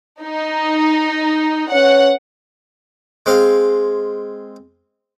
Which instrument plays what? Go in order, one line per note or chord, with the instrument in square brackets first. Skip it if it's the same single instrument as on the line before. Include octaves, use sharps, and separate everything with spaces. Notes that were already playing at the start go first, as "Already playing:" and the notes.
[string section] D#4
[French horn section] C#4 B4 C#5 [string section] F#5
[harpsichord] G#3 C4 F5